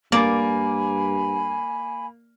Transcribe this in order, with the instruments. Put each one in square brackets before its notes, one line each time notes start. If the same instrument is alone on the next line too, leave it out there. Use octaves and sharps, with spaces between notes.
[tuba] G2 [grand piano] A#3 [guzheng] D5 [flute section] G#5 B5